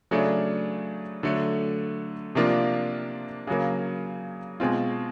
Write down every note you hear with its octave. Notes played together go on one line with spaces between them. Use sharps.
C#3 F#3 A3 D4
D3 F#3 A3
C3 F3 A#3 D4 F4
C#3 F#3 A#3
B2 G#3 C4 F4